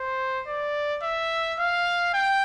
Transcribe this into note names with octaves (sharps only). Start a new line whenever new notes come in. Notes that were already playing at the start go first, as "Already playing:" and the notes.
Already playing: C5
D5
E5
F5
G5